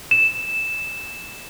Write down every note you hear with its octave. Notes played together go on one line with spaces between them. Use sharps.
E7